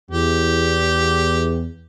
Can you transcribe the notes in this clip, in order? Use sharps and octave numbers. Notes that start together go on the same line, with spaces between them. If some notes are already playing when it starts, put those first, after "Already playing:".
E2 G4